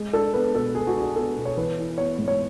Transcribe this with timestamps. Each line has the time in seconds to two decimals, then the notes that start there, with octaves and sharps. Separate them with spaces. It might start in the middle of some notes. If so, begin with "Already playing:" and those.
Already playing: G#3
0.13 D4 A4
0.34 B3 B4
0.54 B2 A4
0.75 G#3 G#4
0.87 F#4
0.96 D4 G#4
1.16 B3 A4
1.36 B2
1.45 C#5
1.57 E3 B4
1.77 E4
1.97 B3 C#5
2.18 G#2
2.28 C#5